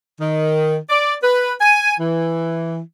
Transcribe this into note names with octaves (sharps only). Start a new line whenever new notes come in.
D#3
D5
B4
G#5
E3